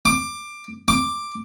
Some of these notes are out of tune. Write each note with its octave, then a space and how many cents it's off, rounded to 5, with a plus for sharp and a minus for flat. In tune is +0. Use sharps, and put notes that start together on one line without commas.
D6 +15
D6 +5